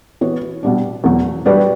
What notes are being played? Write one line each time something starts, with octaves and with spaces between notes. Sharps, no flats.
E3 B3 F#4 C#5
B2 G3 D4
E2 B2 F#3
G3 D4 F#4 B4 D5